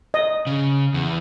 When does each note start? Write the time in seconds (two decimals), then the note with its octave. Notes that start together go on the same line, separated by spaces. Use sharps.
0.14 D#5
0.47 C#3
0.94 E2